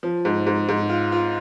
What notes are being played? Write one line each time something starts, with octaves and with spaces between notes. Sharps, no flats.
F3
G#2
G#2
G#2
F4
F4